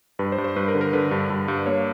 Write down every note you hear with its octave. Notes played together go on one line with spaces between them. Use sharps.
G2 B4
C5
G2
C5
G2 B4
A#4
D3
A#4
D3 B4
G2
G2
G2
A#3 C#5